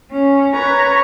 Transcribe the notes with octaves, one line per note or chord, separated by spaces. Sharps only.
C#4
B4 C#5 A#5 C#6